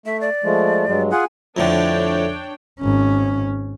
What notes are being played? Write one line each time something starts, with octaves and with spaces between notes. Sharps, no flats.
A3 E5
D5
F3 G#3 A3
G2 F#3 G#3
F4 G#4 F#5 G#5
F2 A2 D3 D4 C#5 G5
G#1 C#4